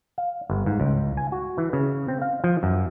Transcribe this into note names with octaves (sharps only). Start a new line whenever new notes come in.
F5
G1
G#2
C#2
G#5
F#4
E3
C#3
C4
F5
F3
F#2